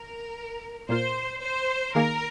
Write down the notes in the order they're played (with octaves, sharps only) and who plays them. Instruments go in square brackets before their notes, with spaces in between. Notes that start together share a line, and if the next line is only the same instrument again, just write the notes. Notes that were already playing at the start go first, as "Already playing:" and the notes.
Already playing: [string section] A#4
[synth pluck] A#2 A#3 F4 [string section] C5
[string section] C5
[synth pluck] D#3 A#3 G#4 F5 [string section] A#4